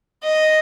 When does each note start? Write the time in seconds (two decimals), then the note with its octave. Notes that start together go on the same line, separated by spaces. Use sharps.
0.24 D#5